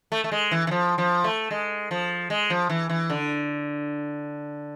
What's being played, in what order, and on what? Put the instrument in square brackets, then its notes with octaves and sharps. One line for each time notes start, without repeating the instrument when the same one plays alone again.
[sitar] A3
A3
G#3
E3
E3
F3
F3
A3
G#3
F3
G#3
F3
E3
E3
D3